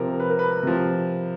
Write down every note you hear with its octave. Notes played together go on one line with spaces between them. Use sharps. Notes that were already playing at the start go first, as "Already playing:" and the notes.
Already playing: C3 F3 A#4
B4
A#4
B4
C3 F3